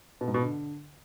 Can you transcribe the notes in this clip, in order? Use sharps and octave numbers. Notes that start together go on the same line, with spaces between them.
B2
G#2
B2
D3